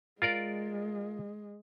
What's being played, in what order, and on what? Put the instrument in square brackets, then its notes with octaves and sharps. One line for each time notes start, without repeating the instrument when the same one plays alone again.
[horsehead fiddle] G#3 [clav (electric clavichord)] F4 A#4 D5